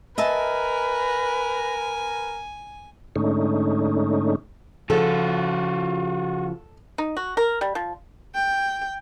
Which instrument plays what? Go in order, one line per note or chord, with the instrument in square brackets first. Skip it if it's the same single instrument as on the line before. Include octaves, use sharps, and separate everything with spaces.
[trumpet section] A#4 [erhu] B4 [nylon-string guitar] D#5 E5 A5 [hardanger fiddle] G#5
[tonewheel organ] G#2 D3 A3 C#4 D#4
[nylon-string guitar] C#3 F3 [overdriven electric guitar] F4 F#4 [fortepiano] A4
[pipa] D#4
F#4
A#4
G3
F3
[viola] G5